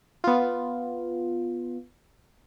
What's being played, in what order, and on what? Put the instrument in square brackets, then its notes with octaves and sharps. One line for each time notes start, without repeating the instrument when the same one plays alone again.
[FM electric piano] B3 F4